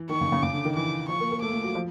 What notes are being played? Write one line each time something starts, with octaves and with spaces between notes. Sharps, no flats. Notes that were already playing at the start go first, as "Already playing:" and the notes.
Already playing: E3
D#3 C#6
C#3
C#3
C#3 D6
D3
D#3
E3 D6
F3 C#6
A#3
A#3
A3 D6
A3
F#3
F3